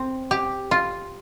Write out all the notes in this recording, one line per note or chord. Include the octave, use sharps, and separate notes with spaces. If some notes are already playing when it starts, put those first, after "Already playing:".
Already playing: C4
G4
F4